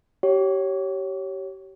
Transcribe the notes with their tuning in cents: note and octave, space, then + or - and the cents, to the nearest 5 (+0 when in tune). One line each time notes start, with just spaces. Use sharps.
G4 -25 C#5 +0